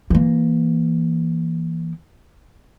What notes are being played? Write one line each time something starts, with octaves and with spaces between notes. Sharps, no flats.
E3 A#3